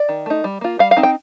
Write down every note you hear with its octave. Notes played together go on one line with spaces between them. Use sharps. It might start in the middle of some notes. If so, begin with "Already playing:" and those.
Already playing: D5
D#3
A3 D#4
G3
A#3 F4
G3 F5
F5
C4 D#4
G5